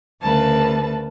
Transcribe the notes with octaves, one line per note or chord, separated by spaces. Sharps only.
D2 C#3 A#4 B4 A5